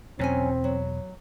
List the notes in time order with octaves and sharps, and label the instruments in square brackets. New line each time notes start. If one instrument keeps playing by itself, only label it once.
[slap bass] E2 B2 [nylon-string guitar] F#3 C#4 G#5 [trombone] C4
[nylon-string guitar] F#3